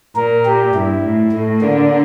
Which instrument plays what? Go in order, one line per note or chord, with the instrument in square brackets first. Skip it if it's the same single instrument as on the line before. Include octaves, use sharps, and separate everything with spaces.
[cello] A#2 [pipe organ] A#4
[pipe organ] G4
[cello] G2 [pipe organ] E4
[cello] A2
[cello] A2 [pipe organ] A3
[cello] D3 [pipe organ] A#3